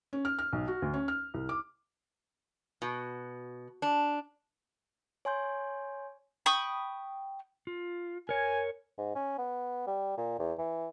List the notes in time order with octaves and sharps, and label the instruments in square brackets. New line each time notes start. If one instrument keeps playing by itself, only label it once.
[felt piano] C#4
F6
F6
B1
F#4
D2
C#4
F6
C2
D6
[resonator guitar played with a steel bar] B2
D4
[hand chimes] C#5 G#5 C6 G6
[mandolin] G5 B5 C#6 D#6
[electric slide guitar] F4
[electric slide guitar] A#4 C#5 [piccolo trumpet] G#5
[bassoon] G#2
C#4
B3
G3
A#2
E2
E3